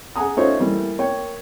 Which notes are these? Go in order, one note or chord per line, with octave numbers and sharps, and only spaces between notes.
G#4 F#5 G#5 A#5 D#6
A3 C#4 D#4 F4 C5 C#5
E3 G3 A3 A#3
A#3 C#5 G5